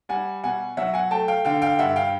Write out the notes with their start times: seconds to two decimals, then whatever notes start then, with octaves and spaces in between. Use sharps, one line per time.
0.09 G3 F#5 G#5
0.43 B2 F#5 G#5
0.77 F#3 E5 F#5
0.94 F#5 G#5
1.11 A3 G5 A5
1.28 F5 G5
1.45 D3 F5 G5
1.62 F5 G5
1.78 G2 E5 F#5
1.96 F5 G5